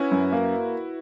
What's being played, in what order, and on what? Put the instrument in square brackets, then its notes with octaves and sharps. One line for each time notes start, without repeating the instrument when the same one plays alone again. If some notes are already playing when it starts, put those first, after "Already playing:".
Already playing: [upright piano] C#4 [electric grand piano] E4 F#4 B4
[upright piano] F#2
A#3